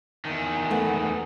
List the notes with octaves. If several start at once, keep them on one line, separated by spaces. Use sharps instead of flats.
E2 D#3
A3 B3